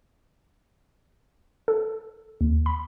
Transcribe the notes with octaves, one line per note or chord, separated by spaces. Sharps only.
A4
D#2
B5